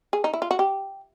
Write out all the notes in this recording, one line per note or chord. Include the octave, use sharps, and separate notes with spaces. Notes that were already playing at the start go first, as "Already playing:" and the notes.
G#4
D#4
E4
F4
F#4
G4